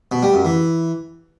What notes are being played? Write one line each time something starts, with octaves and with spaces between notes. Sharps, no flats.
B2
G3
F#2
E3